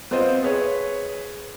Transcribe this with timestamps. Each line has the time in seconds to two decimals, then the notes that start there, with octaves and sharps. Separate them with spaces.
0.11 B3 C4 F4 C5 D#5
0.43 G#4 B4 C#5